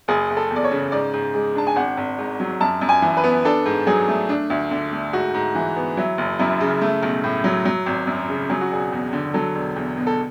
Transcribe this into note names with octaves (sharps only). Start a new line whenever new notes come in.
F#1 G#4
F#1
A4
E2
D5
C#5
C#3
G#2 D5
G#2
G#3
D4 A5
G#5
G#1 F#5
G#1
G#2
F#3
F#2 A5
F#2
G#5
E3
B4
B3
D4 A4
G#2
F#3 G#4
A3
D4
D2
D3
A3
G#2 F#4
G#2
E3
B3
F#3 E4
F#1
F#2 E4
C#3
A3
B1
A2
F#3
F#3
G#1
F#2
C#3
F#3 G#4
F#4
E1 G#4
E2
D3
F#3 A4
E1
E2
B2
A4